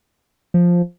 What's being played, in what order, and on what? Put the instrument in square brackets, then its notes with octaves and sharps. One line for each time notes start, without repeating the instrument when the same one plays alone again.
[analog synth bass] F3